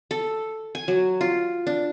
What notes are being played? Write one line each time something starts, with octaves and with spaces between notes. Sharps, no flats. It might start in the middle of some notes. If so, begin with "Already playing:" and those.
A4
G#5
F#3
F4
D4